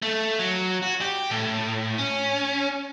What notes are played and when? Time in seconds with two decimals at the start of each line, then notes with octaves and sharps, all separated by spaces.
0.02 A3
0.39 F#3
0.83 F#4
1.01 G4
1.31 A2
1.98 C#4